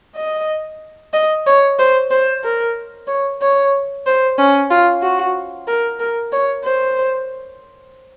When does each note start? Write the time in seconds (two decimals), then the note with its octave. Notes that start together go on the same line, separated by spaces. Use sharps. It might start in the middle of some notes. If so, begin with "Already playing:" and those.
0.16 D#5
1.13 D#5
1.46 C#5
1.79 C5
2.11 C5
2.44 A#4
3.08 C#5
3.41 C#5
4.06 C5
4.38 C#4
4.70 F4
5.02 F#4
5.67 A#4
6.00 A#4
6.32 C#5
6.64 C5